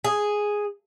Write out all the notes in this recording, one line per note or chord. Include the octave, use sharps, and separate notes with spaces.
G#4